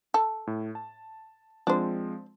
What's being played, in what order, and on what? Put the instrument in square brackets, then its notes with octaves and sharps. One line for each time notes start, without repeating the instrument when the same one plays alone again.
[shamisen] A4
[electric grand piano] A2
A5
[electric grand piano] F3 G#3 C4 [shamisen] D4 C5